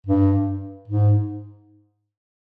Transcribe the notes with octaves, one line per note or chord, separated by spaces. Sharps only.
G2
G#2